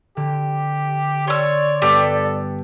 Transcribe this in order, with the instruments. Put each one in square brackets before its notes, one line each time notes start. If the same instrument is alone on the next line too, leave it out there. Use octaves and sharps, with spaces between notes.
[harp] D3 [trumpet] G4
[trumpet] C#5 [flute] D5 [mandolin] C6 E6
[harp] G2 B3 A5 [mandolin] G4 [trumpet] A4